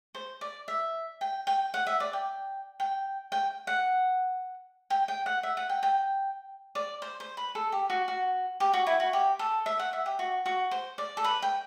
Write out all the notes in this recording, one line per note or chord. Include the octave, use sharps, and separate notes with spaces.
C5
D5
E5
G5
G5
F#5
E5
D5
G5
G5
G5
F#5
G5
G5
F#5
E5
F#5
G5
G5
D5
C5
C5
B4
A4
G4
F#4
F#4
G4
F#4
E4
F#4
G4
A4
E5
F#5
E5
G4
F#4
F#4
C5
D5
A4
B4
G5